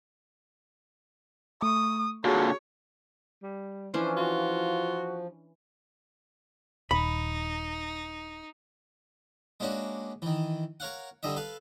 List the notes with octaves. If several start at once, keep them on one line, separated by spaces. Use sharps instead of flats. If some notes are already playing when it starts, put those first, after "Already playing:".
A3 C#6 D#6
A#2 D3 F#4 G#4 C#5
G3
E3 F3 C#4 D4 C5
F4 F#4
D#1 D#4 B5
G#3 A#3 C#4 D4 F#4
D#3 E3
A#4 C#5 F5 F#5
G2 D3 G3 D#5 E5
A4 B4 F5